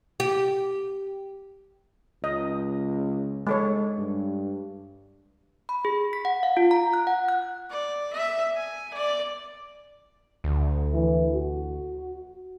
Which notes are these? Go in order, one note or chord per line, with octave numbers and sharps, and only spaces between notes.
G4
C#2 D#5
G#3 A4 C#5
G2
B5
G#4
B6
F#5
F5
F4
A#5
F#6
F#5
F#6
D5
E5
G#5
D5
D2
E3
F#4